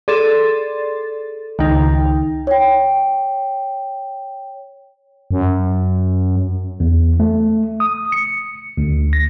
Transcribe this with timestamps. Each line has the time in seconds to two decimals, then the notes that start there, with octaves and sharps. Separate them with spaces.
0.08 G#4 A4 D5 C6 A6
1.59 C#2 D#3 D#4 G5
2.47 C#5 G5
5.31 F#2
6.80 E2
7.20 A3
7.80 D#6
8.12 C#7
8.77 D2
9.13 A#6